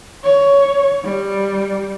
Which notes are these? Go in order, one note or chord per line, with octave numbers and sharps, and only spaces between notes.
C#5
G3